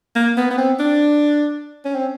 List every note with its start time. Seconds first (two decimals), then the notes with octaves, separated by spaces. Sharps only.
0.16 A#3
0.37 B3
0.51 B3
0.58 C4
0.79 D4
1.85 C#4
1.95 C4